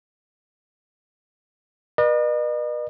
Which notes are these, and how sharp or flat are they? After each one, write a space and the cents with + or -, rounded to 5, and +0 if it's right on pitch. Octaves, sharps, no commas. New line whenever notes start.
B4 -40 D#5 -45